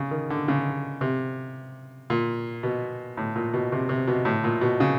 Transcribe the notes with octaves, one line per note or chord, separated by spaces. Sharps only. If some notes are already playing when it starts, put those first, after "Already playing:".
Already playing: C#3
D#3
D3
C#3
C3
A#2
B2
A2
A#2
B2
C3
C3
B2
A2
A#2
B2
C#3